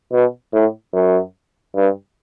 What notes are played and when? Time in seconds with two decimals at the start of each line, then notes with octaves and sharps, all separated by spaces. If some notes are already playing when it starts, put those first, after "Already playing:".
0.12 B2
0.53 A2
0.94 F#2
1.76 G2